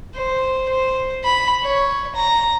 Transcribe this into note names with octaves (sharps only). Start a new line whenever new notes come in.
C5
C5
B5
C#5
A#5